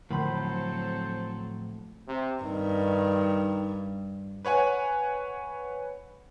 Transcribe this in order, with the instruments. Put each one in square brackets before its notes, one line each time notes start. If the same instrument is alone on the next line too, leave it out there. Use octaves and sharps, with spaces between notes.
[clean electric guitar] A2 F3 B5 [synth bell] D3 [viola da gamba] F#3 C4 A4 [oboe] C5
[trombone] C3
[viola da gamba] G2 [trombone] D#3
[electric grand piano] B4 C#5 F#5 G#5